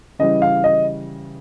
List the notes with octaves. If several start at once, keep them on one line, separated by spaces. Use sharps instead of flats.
C#3 E3 G3 D#5
F5
D#5